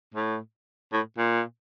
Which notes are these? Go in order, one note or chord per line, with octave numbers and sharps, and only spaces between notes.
A2
A2
A#2